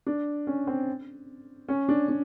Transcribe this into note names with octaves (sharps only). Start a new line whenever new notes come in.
D4
C#4
C4
C#4
D4
D4